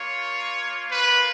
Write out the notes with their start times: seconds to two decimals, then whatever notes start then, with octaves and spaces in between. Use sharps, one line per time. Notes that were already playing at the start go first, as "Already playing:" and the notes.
Already playing: A#3 F4 C#5
0.89 B4